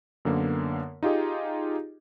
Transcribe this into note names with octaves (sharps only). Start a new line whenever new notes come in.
F#2 D3 A#3 B3
D#4 F4 G4 G#4 D#5